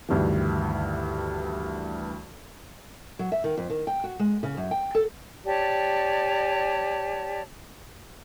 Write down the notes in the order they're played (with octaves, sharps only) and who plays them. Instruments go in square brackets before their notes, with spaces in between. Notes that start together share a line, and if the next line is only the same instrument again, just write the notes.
[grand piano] D2 G2 D#3 E3
[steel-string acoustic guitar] F#3
E5
D#3
F2
D#3
G5
F#4
G#3
C#3
F#2
G5
A4
[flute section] G4 C#5 D5 A5